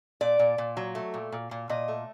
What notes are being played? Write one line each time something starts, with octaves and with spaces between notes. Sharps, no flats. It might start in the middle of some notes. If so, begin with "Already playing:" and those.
A#2 D5
A#2
A#2
F#3
A3
A#2
A#2
A#2
A#2 D#5
A3